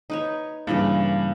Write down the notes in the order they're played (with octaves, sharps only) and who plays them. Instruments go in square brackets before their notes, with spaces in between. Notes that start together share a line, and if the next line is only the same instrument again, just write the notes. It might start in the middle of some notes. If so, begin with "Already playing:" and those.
[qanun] D#4 B4 C#5
[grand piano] G2 [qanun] C#3 E3 A#3